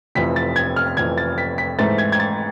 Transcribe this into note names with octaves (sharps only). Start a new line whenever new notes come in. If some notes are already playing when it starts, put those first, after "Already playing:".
F1 F2 E3 B6
A6
G#6
F6
F1 F2 E3 G#6
A6
B6
B6
G#2 E3 A3 C4 A6
G#6
G#6
A6